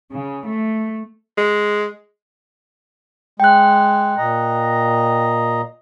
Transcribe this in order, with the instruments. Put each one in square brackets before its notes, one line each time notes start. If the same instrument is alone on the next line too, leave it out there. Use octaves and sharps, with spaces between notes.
[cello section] C#3
A3
[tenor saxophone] G#3
[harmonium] G#3 [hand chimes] G5 F#6
[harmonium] A#2 D#5 A#5